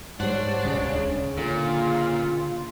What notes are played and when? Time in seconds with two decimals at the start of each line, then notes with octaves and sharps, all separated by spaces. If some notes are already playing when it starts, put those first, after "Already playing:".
0.20 G#2 G3 D4 C5 C#5 F#5
0.64 D#1 C#2 C#3
1.38 A#2 D3 F4